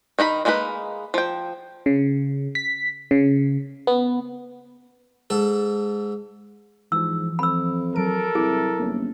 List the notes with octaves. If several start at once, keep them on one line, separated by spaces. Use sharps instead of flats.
D#3 D#4 F#4 B5
G#3 A#3 D#4 F4 B4
F3 G5
C#3
B6
C#3
B3
G#2 A4
G#2 E3 F3 E6
F2 B5 E6
F#3 A4 A#4 D7
C2 E4 G#4
G1 A#3 C#4